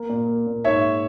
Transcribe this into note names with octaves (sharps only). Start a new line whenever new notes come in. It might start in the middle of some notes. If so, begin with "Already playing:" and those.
Already playing: A#3
A#2
A#3
A#2
G#2 C#5 E5